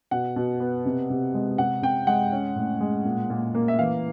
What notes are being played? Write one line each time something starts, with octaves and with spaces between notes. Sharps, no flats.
B2 F#5
B2
B3
C3
C3
G#3
C3 F#5
C3 G5
G#3 F#5
C#4
A2
G#3
A#2
A#2
A#3
E5
E3 F5